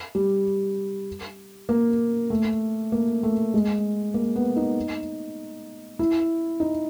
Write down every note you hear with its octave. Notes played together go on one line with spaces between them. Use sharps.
G3
A#3
A3
A#3
A3
G#3
A#3
B3
D#4
E4
D#4